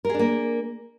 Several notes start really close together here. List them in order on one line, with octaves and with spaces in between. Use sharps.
A#4 G#4 D4 A#3